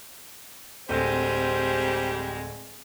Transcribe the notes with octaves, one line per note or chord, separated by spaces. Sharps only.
D1 G3 G#3 C4 A4 C5 G6